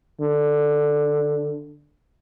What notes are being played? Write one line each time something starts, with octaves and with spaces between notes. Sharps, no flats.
D3